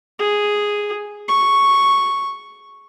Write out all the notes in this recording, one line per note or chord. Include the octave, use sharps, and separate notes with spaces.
G#4
C#6